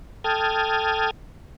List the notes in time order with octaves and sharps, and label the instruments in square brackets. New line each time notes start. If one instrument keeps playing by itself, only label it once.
[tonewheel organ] A4 G5 A5 D#6 F6 G#6